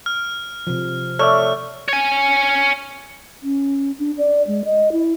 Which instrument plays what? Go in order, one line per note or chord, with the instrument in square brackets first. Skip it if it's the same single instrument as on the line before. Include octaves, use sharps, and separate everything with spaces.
[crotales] F6
[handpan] C3 F3
[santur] A3 [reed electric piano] C#5 D5 E5 [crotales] F6
[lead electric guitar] C#5 G#5
[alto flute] C#4
D4
D5
G#3
D#5
E4